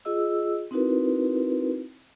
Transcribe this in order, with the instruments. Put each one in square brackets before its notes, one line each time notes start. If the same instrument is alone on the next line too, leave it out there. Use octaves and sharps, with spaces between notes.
[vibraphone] F4 G#4 D#5 E6
C4 D#4 E4 F#4 A#4 B4